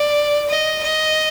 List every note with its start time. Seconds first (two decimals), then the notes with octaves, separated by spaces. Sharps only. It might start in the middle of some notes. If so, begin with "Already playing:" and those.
Already playing: D5
0.49 D#5
0.83 D#5